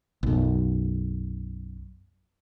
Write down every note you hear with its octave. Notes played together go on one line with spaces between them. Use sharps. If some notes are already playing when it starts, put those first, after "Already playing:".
B1 F#2